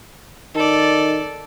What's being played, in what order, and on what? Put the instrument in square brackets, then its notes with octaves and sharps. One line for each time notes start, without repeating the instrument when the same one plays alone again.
[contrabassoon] D#3 [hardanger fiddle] A4 D5